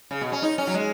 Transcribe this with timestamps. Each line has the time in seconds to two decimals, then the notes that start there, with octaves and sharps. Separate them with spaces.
0.11 C#3
0.21 B2
0.32 C#4
0.42 D#4
0.58 C#4
0.67 F#3
0.74 G#3